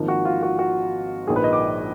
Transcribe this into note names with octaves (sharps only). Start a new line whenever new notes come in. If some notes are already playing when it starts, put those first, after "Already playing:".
Already playing: G#1 G#2 F3 A#3
F#4
F4
F#4
F#4
A#1 G#2 F3 A#3 G#4
B4
D#5
D6